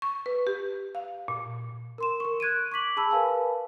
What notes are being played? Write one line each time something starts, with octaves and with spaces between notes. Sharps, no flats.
C#6
B4
G4
F5
A#2
A#4 C6 E7
A#4 C#6
F#6 G#6 D7 D#7
C#6 D6 B6 F#7
G#4 A5 B5 E6
A#4 B4 F5 G#5 A5